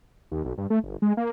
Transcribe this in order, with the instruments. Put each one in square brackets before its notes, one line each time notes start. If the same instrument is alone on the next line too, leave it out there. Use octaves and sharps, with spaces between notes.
[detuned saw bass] D#2
B1
G2
A3
G1
G#3
A#3